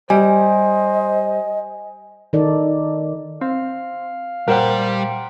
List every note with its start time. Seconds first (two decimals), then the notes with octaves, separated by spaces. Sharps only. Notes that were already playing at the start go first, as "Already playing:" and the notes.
0.10 G3 C5 D#5 G#5
2.33 D#3 D#4 A4 D5
3.41 C4 F5
4.48 A#2 G3 A#4 C5 F#5 G5